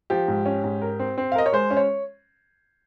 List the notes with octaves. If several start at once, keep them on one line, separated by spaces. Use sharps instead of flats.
F3 G4
G#2
C#4
G#2
A#4
C4
C4
F5
A#4 D#5
C#5
G#3 C5
C#4
C#5